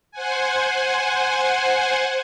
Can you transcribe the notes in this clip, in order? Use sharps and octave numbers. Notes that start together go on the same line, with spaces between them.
C5 F#5 G#5